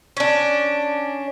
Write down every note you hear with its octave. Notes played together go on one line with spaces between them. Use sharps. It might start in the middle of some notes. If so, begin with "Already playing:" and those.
C#4 D4